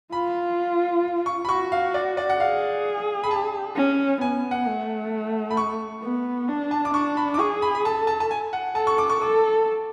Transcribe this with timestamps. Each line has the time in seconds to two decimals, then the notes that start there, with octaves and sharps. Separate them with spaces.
0.12 F4 B5
1.26 C#6
1.45 B5
1.49 F#4 C#6
1.72 F5
1.94 D5
2.17 D5
2.29 F#5
2.40 G#4 F5
3.24 B5
3.31 A5
3.76 C#4
4.21 B3 G#5
4.51 F#5
4.67 A3
5.50 B5
5.57 C#6
6.03 B3
6.48 D4
6.71 A5
6.85 D6
6.94 D4 C#6
7.17 B5
7.34 D6
7.39 G#4 C#6
7.62 B5
7.75 B5
7.85 A4 A5
8.07 A5
8.20 A5
8.31 G#5
8.53 F#5
8.75 A4 A5
8.87 C#6
8.98 D6
9.10 C#6
9.21 A4 D6